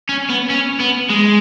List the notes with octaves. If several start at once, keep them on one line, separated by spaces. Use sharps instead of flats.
C#4
B3
C#4
B3
G#3